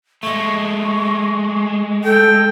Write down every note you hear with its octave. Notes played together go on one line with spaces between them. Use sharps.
G#3 A3 C#6
A4 G5